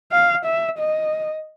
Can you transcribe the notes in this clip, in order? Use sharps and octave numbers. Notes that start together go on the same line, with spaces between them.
F5
E5
D#5